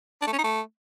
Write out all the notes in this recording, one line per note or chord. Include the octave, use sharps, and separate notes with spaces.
D4
A3
C#4
D#4
A3